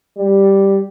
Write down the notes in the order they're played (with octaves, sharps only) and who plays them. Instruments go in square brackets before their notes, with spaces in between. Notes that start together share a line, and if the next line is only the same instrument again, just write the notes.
[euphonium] G3